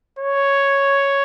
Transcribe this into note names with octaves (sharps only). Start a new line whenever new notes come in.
C#5